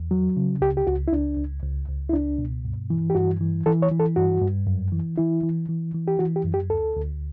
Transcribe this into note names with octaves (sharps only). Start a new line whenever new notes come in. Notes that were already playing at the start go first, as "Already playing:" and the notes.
Already playing: E2
F#3
C#3
C#2 G4
G4
C#2 F#4
E4
C#2 D4
C#2
C#2
C#2
E4
C#2 D4
B2
G2
E3
G4
G2 F#4
E3
E3 A4
C#5
E3
A4
G2 F#4
G2
F#2
E3
E3 E4
E3
E3
E3
G4
E3 F#4
G4
F#2
G4
D2 A4
D2